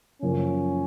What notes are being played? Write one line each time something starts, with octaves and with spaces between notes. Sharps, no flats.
F#2 C#3 F3 A#3 C#4